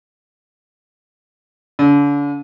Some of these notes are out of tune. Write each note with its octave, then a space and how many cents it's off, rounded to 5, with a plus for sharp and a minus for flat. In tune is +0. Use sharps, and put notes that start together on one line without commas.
D3 -40